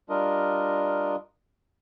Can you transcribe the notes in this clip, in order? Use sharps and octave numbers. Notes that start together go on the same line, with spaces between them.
G3 D4 F4 A#4 D#5